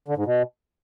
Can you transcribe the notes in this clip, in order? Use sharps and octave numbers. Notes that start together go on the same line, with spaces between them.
D3
G#2
B2